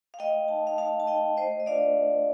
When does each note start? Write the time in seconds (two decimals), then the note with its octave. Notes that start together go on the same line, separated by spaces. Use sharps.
0.14 F5
0.19 A3 D#5 G5
0.48 D#4 A5
0.66 F5 A5
0.78 A3 F5 A5
1.00 A5
1.07 D#4 D#5 G5
1.37 A3 C5 D#5
1.60 D#5
1.66 D4 F4 D5 F5